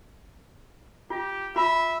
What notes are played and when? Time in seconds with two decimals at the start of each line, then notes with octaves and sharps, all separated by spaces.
1.10 F4 G4
1.56 F4 E5 B5